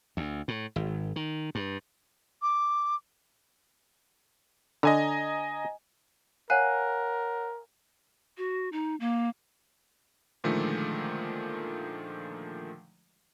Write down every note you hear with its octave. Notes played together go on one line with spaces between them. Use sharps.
D2
A2
G#1
D#3
G2
D6
D3 D#5 G#5 A#5
A#4 C#5 F5 F#5 G#5 F#6
F#4
D#4
A#3
A#2 D3 D#3 F3 G#3 A3